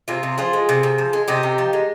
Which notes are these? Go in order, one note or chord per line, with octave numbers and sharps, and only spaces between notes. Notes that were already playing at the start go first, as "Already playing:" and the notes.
C3 F4 G#4
C3
F3 F4 G#4
G#3
C3
C3
F3
G#3
C3 D#4 G4
C3
F3
G#3